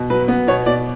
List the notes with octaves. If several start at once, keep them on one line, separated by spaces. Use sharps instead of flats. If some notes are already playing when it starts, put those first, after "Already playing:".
Already playing: B2
F#3 B4
B3
B2 C#5
B2 D5